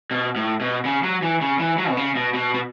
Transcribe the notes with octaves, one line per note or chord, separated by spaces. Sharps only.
B2
A2
B2
C#3
F#3
E3
C#3
E3
F#3
B2
C#3
B2
B2
B2